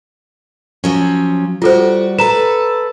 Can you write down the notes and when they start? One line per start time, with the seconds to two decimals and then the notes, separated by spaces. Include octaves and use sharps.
0.84 F3 F#3 C#4
1.62 G3 F4 F#4 A4 C5
2.19 A4 B4 A#5 E7